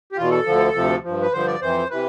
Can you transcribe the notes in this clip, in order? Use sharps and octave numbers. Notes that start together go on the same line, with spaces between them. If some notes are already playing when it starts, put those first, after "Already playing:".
G4
E2 B2 F4
A4
D2 D3 F3
D2 C3 F3
G2 F3
B4
G2 D3 F3 C5
D5
F2 E3 C5
C3 E3 B4